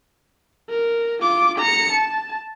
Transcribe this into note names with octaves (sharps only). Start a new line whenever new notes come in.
A#4
F4 D6
A#5 C#7
A5